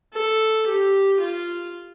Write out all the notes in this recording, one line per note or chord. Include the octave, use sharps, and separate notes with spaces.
A4
G4
F4